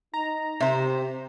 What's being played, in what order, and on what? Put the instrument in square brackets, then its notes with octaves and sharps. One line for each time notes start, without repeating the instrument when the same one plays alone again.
[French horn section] D#4 [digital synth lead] A#5
[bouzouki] C3 C5 [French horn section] G4 [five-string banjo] E5